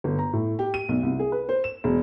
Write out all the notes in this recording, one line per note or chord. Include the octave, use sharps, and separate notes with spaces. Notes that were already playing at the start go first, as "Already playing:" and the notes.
G1
A#5
A2
G4
D#7
B1
C2
G#4
B4
C5
E7
E1